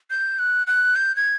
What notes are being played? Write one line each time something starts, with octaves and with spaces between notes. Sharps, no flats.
G6
F#6
F#6
G6
G#6